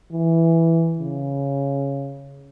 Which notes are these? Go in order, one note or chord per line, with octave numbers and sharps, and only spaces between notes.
E3
C#3